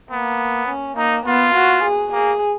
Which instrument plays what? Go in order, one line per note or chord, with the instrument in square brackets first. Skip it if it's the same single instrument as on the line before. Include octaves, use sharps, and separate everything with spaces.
[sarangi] A#3 [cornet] B3
[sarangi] C#4
[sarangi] A#3 [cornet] D#4
[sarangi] B3 [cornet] F4
[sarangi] F#4
G#4
[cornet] A#3 [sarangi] G#4